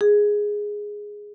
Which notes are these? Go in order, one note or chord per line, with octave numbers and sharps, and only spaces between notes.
G#4